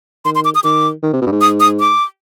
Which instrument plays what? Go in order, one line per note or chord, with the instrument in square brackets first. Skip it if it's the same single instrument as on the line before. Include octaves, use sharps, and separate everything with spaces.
[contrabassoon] D#3 [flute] C6
[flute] C6
D6
D#6
[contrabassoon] D#3 [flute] D6
[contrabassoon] D#3
C3
B2
G2
G#2
[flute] D#6
D#6
D6